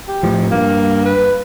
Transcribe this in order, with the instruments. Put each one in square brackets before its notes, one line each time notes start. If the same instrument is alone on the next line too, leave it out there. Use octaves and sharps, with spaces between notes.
[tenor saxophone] G4
[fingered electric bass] A2 F3
[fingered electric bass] G2 [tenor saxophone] A#3
[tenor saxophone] B4